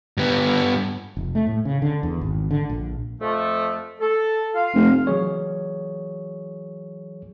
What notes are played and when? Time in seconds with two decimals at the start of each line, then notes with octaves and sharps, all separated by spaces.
0.17 G2 B3
1.17 F1
1.35 A3
1.47 A2
1.65 C#3
1.82 D3
2.03 E2
2.21 G#1
2.51 D3
2.70 A#1
3.20 F2 F3 A3
4.00 A4
4.55 F4 F5
4.75 F1
5.07 E3 F#3 G#4 C#5